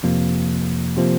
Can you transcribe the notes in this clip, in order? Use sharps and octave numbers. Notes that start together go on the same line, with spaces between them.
F2 C3 F3 A#3
C3 F3 A#3